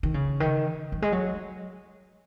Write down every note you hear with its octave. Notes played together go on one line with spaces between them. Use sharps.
D#3
C#3
D#3
F#3
G#3
F#3